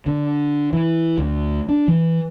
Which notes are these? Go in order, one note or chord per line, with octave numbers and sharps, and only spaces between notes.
D3
E3
D2
D4
E3